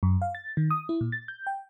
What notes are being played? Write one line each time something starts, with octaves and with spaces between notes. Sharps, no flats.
F#2
F5
A6
D#3
D#6
E4
A#2
A6
G6
G5